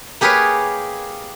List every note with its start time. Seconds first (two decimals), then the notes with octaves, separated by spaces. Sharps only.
0.21 A#3 G4 G#4 A#4 B4 C#5